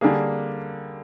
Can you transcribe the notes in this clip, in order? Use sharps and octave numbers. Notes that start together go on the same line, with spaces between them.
D3 G3 A#3 G#4